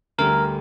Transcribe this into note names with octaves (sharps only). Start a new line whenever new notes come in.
D2 D3 G3 A#4